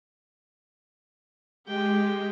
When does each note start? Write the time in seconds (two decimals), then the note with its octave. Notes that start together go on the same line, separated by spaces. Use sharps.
1.67 G#3 G4 G5